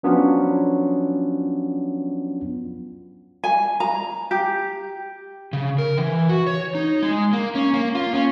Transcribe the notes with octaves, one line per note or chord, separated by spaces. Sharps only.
F3 F#3 B3 C#4 D4 F4
G#5
A#5
G4
C#3
A#4
E3
F#4
C#5
D#4
G#3
A#3
C#4
A#3
F4
C#4